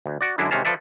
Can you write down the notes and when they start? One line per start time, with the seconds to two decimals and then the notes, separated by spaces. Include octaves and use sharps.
0.06 D2
0.21 F#4 D5
0.38 F#2 D3 G#3 D4 E4
0.51 C3 D#3 G#3 C#4 F5 A5
0.65 F3 A4 B4 D5 E5